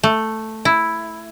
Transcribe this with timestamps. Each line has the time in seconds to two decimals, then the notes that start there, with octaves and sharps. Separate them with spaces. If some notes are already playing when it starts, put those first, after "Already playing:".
0.03 A3
0.65 E4